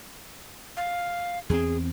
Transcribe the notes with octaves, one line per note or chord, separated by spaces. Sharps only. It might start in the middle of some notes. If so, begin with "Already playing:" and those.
F5
E2 C4 G#4